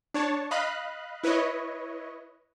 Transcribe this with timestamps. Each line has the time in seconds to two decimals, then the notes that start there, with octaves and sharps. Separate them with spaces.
0.14 D4 C#5 A5
0.51 D#5 F5 B5 F#6
1.24 E4 B4 C#5 D#5